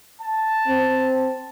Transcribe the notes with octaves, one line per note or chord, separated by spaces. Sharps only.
A5
C4